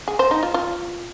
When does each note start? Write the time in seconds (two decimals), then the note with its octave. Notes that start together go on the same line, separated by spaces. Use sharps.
0.08 G#4
0.19 C5
0.31 D#4
0.43 F4
0.54 F4